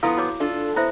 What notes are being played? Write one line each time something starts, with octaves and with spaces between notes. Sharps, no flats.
F3 B3 E4 F4 A4 F5
F#4 C#5 D6
D4 F4 A4
B3 E4 C5 E5